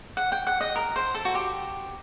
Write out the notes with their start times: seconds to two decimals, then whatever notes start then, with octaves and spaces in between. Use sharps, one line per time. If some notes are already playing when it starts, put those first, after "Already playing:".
0.17 F#5
0.32 G5
0.47 F#5
0.61 D#5
0.76 A#4
0.96 C5
1.15 A4
1.25 F#4
1.35 G4